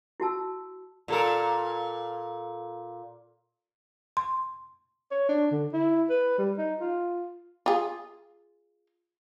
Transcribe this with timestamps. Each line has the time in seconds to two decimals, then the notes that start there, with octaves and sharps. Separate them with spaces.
0.20 E4 F#4 A5 E6
1.08 A#2 A4 A#4
4.17 C6
5.11 C#5
5.29 D4
5.51 D3
5.73 E4
6.09 B4
6.38 G3
6.58 D#4
6.80 F4
7.66 F4 G#4